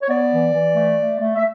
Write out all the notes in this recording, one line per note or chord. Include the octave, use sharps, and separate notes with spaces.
C#5
B3 D5
E3
E3
A3
A3
A3
E5